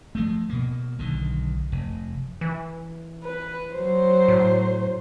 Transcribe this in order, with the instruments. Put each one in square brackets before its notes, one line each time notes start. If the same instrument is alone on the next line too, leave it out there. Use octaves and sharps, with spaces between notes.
[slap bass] F3 G#3 A3
B2 A#3
B1 D3 D#3
F1
[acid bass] E3
[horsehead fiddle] B4
F#3 C5
[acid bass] A2